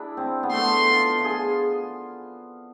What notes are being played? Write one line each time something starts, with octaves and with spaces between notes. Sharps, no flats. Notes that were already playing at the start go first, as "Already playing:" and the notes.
Already playing: D4 E4 G#4
C4
B3
A3 C6
F4
F4
G#4